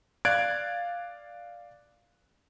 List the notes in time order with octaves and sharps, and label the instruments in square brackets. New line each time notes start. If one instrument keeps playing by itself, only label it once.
[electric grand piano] D5 F5 F#6 G#6 A6 D7